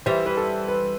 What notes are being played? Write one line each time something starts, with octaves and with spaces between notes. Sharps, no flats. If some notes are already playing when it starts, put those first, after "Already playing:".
E3 G3 C5
B4
A4
B4